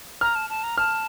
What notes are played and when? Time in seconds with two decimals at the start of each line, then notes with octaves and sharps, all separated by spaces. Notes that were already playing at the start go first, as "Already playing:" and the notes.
0.21 A#5 F6
0.35 A5
0.50 A5
0.63 A#5
0.78 A5 F6